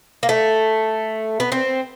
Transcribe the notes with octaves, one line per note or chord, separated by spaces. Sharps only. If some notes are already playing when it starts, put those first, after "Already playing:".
A#3
A3
B3
C4